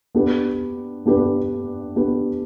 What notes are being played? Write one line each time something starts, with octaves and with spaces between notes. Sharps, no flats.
B3 D4 G4 B4
B3 D4 G4 B4
B3 D4 G4 B4